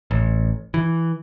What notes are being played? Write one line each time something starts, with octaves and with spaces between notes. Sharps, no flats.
A1
E3